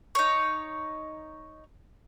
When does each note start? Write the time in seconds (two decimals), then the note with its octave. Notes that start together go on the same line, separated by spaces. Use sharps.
0.15 D#4 C#5